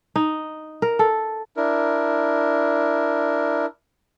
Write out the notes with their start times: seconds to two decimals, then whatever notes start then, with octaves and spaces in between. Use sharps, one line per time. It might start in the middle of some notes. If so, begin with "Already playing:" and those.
0.16 D#4
0.82 A#4
0.99 A4
1.57 D4 E4 A#4